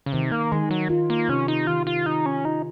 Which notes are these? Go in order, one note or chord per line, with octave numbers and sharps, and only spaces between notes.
C#3
C3 D#3
A#3
D#3 G#3
F#3
F4
A#3
C3 C#4
D#4
D#3 F4
F4
D#4 F4
C#4
D#4 F4